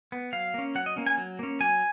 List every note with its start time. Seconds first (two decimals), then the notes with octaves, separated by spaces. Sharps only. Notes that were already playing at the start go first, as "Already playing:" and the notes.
0.12 B3
0.33 F#3 F5
0.54 A#3 C#4
0.75 F#3 F#5
0.86 D#5
0.96 A#3 C#4
1.06 G#5
1.18 F#3
1.39 A#3 C#4
1.60 F#3 G#5